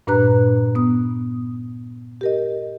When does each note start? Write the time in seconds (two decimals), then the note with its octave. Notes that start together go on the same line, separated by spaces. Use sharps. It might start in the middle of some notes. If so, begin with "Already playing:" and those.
0.07 G2 A#2 D4 B4 A#5 F#6
0.75 B3 D#6
2.21 G4 A#4 D#5